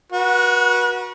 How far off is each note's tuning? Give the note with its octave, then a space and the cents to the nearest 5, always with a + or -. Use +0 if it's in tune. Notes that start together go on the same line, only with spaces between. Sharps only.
F#4 -10 B4 -40